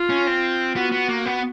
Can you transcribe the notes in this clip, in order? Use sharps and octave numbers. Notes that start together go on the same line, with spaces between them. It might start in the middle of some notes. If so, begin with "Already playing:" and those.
Already playing: F4
C#4
C4
B3 F#4
B3
A#3
B3